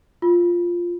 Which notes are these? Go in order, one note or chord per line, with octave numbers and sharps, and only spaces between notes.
F4